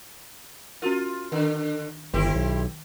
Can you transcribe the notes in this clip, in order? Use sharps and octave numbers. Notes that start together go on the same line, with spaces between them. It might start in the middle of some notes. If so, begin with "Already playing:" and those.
C#4 F4 F#4 A#4
D3 D#3 D4
G1 D#3 C4 E4 G4
B1